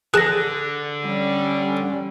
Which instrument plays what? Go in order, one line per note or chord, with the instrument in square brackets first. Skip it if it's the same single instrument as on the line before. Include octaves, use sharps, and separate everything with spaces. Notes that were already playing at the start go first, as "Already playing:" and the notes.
[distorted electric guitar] D3 [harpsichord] G#4 A5 [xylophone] F#6 A#6
[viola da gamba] G3 C#4